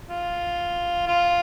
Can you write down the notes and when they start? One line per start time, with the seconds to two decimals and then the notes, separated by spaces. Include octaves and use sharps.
0.09 F4
1.07 F4